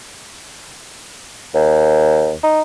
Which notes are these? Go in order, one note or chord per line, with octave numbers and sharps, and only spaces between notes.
D#2
D#4